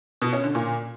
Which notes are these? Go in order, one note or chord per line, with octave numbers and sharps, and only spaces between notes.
B2
C#4
D3
A#2